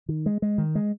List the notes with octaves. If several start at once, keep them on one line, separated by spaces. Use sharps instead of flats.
D#3
G#3
G#3
D#3
G#3